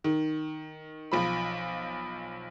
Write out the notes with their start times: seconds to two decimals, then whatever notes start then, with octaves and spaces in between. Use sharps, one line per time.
0.04 D#3
1.12 B1 F3 B5